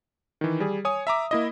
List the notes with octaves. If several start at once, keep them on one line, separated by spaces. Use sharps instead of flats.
D#3 E3
G3 G#4
C#5 G#5 D#6
E5 A#5 D6
A#3 E4 D#5